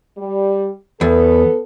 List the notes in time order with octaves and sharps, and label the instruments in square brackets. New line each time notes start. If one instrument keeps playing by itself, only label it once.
[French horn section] G3
[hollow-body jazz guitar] E2 [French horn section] B3 A4